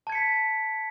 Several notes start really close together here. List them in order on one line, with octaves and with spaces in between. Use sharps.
A5 G#6 C#7 B6